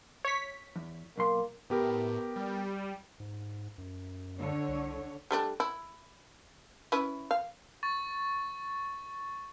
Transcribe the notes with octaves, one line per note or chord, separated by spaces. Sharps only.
C#5 B6
E2
B1 A#3 C6
A2 B3 G4 A#4
G3
G#2
F#2
D3 C#5
C2
G3 A3 D4
E4
C#4 E4 B4
F5
C#6 A6